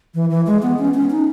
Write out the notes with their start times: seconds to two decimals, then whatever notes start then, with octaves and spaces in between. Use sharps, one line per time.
0.15 E3
0.30 E3
0.47 G#3
0.62 B3
0.79 C#4
0.94 C#4
1.10 D#4